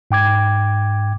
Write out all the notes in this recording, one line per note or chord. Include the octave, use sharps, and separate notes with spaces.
G#2 G5 D6 G#6